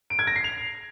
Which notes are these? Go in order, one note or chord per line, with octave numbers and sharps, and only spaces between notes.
D7
G#6
A#6
C7
F7